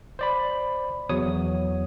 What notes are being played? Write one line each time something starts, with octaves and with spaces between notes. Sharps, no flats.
C5 D5 B5
E2 F#3 C#5 D#6